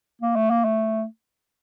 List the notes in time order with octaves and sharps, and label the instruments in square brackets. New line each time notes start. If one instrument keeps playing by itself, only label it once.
[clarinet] A#3
A3
A#3
A3